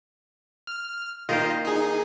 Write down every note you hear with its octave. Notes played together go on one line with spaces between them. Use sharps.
F6
D#3 A#3 F4 C5 D#5
D#4 G#4